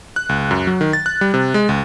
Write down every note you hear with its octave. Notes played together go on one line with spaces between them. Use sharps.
F#6
C#2
F#2
F#3
D#3
A6
F#6
G3
C3
G#3
C#2